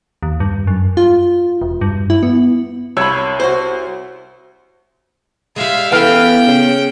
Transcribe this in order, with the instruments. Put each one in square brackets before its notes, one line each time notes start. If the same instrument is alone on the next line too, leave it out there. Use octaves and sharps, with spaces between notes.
[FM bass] D#2
G2
F#2
F4
E1
G2
E4
B3
[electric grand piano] C2 E6 [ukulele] C#5 B5
[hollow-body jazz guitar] F#4 C5
[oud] G3 G#3 [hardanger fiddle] E5 F5
[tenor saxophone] E3 [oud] B3 C#4 A4 [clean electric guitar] F5 [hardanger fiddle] G5
[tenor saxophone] C#3